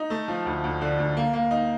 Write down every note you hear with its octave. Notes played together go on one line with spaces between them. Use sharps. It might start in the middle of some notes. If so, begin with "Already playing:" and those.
Already playing: D#4
A3
F3
D2
D2
D3
D2
A#3
A#3
D#4